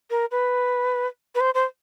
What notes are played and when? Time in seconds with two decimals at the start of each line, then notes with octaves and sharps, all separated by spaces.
0.10 A#4
0.31 B4
1.35 B4
1.40 C5
1.55 C5